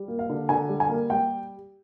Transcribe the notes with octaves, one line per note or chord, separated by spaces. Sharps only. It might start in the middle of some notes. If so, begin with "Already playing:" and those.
Already playing: G3
A#3
F5
D3
D3 G#5
G3
G#5
A#3
G3 G5